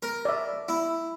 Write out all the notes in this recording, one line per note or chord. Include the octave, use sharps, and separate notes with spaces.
A#4
D5 E5
E4